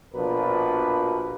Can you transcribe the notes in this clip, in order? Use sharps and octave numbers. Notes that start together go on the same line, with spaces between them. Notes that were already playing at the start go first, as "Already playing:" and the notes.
A#1 B2 F3 D4 A#4 B4